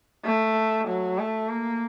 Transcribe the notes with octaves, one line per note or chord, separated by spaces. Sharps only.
A3
F#3
A3
A#3